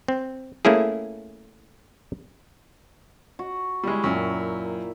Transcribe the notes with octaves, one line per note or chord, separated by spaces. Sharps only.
C4
A3 A#3 C#4 E4 G#4
F#4
G3 G#3 E4 F#4
F#2 A#2 E5 G5